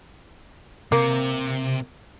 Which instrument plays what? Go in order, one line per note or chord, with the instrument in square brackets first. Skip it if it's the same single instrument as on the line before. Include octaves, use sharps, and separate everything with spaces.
[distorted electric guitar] C3 [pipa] A#3